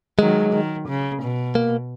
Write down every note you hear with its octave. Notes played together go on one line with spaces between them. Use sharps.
D#3 F#3 G#3
D#3
C#3
B2
A#3